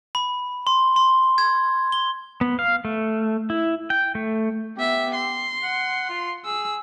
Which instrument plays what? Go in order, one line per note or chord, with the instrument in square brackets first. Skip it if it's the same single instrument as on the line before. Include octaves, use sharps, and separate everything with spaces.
[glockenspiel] B5
C6
C6
G#6
G7
[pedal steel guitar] B3
F5
A3
E4
G5
A3
[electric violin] B3 E5 [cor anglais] G4
[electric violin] C6
[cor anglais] F#5
F4
[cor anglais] G#4 [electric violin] E6